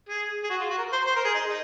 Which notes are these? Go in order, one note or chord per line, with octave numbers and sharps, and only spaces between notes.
G#4
G#4
F#4
F4
F#4
A#4
C5
C5
A#4
G#4
D#4
D#4